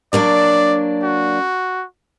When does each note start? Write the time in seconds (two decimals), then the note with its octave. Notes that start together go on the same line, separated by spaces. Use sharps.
0.13 F#3 A#3 D4 D5
1.02 F#4